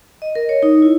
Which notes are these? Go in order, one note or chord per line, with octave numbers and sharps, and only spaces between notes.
D#5
A#4
C#5
D#4
E4